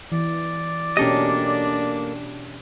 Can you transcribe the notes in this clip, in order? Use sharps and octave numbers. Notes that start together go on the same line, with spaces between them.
E3 D5
B2 A#3 C#4 D4 G4 A4 D#5